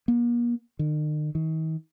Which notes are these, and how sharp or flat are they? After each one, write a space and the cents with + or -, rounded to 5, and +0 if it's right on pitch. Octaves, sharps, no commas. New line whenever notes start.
A#3 +40
D#3 -45
D#3 +40